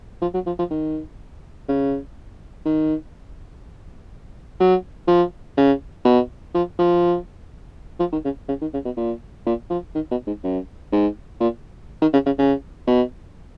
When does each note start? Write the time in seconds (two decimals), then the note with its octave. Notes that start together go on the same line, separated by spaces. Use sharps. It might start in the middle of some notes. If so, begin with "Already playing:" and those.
0.22 F3
0.34 F#3
0.46 F3
0.59 F3
0.70 D#3
1.68 C#3
2.65 D#3
4.60 F#3
5.08 F3
5.57 C#3
6.05 B2
6.55 F3
6.79 F3
8.00 F3
8.12 D#3
8.25 C#3
8.49 C#3
8.61 D#3
8.74 C#3
8.85 B2
8.97 A#2
9.46 A#2
9.70 F3
9.95 D#3
10.11 B2
10.27 G#2
10.44 F#2
10.92 G#2
11.40 A#2
12.02 D#3
12.13 C#3
12.26 C#3
12.38 C#3
12.87 B2